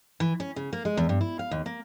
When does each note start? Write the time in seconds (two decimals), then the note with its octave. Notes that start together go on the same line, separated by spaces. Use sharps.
0.20 E3
0.40 C#4
0.56 C#3
0.73 A#3
0.85 G#3
0.97 E2
1.09 G2
1.21 E4
1.39 F5
1.51 D#2
1.66 A#3